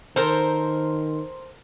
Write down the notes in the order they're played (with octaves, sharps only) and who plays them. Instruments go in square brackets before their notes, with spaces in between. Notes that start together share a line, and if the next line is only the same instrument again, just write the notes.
[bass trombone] D#3 [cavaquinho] A4 A#4 A#5 [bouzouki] C5